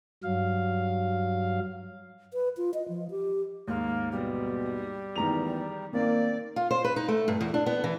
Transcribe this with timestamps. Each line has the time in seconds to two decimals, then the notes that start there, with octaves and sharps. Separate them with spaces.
0.24 G2 F#3 F5
2.33 B4
2.57 F4
2.74 D#5
2.88 F3
3.11 G4
3.68 D#2 G#2 A#3
4.11 B2 G3
5.16 E2 D#3 A#5 F7
5.93 D#3 A#3 C4 D5
6.56 F4
6.71 C5
6.84 B4
6.96 D#4
7.08 A3
7.28 G2
7.41 E2
7.54 D4
7.66 B3
7.84 E3